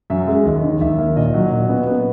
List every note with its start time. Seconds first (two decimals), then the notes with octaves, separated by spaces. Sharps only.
0.10 F#2 E5
0.27 G#3
0.45 D#2 D#5
0.63 D#3
0.81 D#2 E5
0.98 A#3
1.16 A#2 D#5
1.34 F#3
1.51 A#2
1.69 B3
1.86 B3